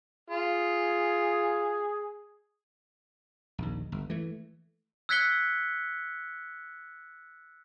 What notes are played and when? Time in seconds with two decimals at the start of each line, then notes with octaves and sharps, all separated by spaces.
0.30 F4 G#4
3.58 A#1 D#2
3.92 G1
4.10 E3 A3
5.09 E6 F#6 G#6 B6 C#7 G7